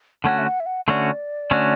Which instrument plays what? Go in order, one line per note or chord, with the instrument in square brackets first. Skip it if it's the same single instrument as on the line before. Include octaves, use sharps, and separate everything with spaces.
[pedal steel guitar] D3 A3 C#4 F#4 [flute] F#5
[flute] E5
F#5
E5
F#5
[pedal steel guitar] D3 A3 C#4 F#4 [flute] D5
[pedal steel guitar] D3 A3 C#4 F#4